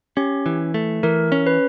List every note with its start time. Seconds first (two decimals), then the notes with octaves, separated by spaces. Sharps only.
0.17 C#4 G4
0.46 E3
0.74 A3
1.03 E3 A#4
1.32 C#4
1.47 B4